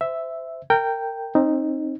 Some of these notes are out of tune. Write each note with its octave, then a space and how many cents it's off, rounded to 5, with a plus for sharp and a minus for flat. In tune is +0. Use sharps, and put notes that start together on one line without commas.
C5 -25 E5 +0
A#4 -25 G5 +0
C4 +30 D#4 -5